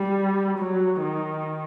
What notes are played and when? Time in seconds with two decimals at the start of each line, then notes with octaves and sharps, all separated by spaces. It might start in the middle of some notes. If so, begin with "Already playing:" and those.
Already playing: G3
0.59 F#3
1.01 D#3